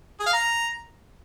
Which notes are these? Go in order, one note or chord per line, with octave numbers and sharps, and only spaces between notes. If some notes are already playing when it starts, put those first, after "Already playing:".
G#4
F5
A#5